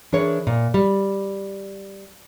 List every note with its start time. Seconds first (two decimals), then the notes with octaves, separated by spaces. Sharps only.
0.12 E3 D4 G#4 A#4 C#5
0.47 A#2
0.74 G3